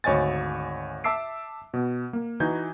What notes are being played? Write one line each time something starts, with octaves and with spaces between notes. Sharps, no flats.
G#1 D2 C#5 D#5 G#5 A6
E5 A5 D6 E6 C7 D7
B2
A#3
E3 D#4 F#4 G6 G#6